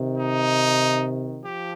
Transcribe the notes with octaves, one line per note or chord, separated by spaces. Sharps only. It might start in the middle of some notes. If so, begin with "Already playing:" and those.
Already playing: C3 D#3
D#4
F3 G4